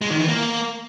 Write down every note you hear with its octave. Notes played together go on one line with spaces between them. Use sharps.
G#3
D#3
E3
A#3